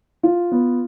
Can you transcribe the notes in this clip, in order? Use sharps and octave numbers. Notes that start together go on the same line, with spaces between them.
F4
B3